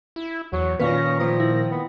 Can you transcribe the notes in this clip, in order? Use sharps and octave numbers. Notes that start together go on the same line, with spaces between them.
E4
E2 F#3
A#2 D#3 C#4 B4 F5 C#6 A#6
F3 A#3 B4 D#6
E4
B3